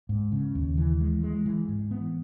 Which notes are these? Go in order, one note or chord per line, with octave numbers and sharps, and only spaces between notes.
G#2
C#3
D#2
E3
G#3
G#3
E3
G#2
B3